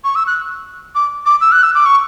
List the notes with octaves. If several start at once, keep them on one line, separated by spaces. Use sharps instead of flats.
C#6
E6
F#6
D6
D6
E6
F#6
E6
D6
C#6